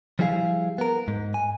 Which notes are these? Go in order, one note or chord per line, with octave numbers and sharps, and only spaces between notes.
F3 G3 E4 G#4 E5 F5
B3 A#4
G#2
G#5